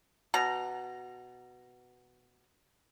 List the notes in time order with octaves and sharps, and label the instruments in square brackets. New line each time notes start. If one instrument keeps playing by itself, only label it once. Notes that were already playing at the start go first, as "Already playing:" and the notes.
[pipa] B2 A#5